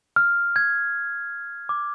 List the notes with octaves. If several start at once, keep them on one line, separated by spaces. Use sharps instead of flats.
F6
G#6
D6